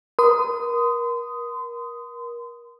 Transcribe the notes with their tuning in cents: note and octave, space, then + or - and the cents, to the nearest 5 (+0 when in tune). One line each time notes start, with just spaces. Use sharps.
A#4 +30 C6 -35 D#6 +0